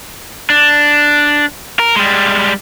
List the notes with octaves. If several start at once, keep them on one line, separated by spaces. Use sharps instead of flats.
D4
A#4
G3 G#3